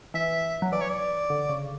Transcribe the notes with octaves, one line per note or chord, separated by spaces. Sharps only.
E3 E5
F#3
E3 D5
C#5
D5
D3
C#3